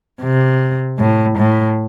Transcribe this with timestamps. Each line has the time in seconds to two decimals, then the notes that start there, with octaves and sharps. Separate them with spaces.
0.22 C3
0.99 A2
1.38 A2